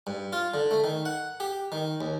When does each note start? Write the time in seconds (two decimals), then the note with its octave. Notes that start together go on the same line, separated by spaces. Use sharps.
0.07 G2
0.33 F4
0.54 D3
0.71 A3
0.84 D#3
1.05 F#5
1.40 G4
1.72 D#3
2.01 D#2